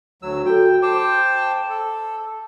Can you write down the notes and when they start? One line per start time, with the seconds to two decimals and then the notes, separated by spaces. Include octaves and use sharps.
0.22 D2 F#3 E6
0.46 F#4 A4 G5
0.82 C5 G5 A5 D6
1.70 A4